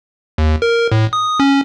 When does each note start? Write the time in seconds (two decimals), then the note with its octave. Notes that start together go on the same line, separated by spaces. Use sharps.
0.38 D#2
0.62 A#4
0.92 A2
1.13 D#6
1.40 C#4